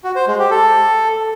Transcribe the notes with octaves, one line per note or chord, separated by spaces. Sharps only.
F#4
C5
G#3
G4
A4